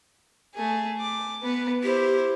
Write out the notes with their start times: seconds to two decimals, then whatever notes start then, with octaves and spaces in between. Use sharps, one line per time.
0.54 A3 G#4
1.00 D6
1.43 B3 B4
1.83 E4 G4 C5